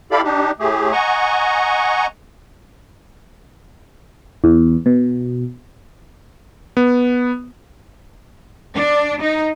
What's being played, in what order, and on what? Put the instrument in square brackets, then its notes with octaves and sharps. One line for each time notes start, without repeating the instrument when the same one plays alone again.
[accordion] E4 G4 A4 D5 F5 B5
D4 D#4 G4
A2 A3 G4 G#4
D#5 F#5 G#5 A#5 C#6
[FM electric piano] E2
B2
[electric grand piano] B3
[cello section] D4
D#4